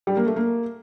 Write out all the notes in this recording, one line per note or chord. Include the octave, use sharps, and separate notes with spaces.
G3
A#3
A3
A#3